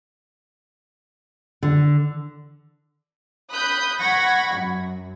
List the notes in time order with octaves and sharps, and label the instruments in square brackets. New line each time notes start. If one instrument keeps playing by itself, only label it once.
[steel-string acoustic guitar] D3
[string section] B5 D#6 F#6 G6
F#5 B5 C#6 G#6 A#6
F#2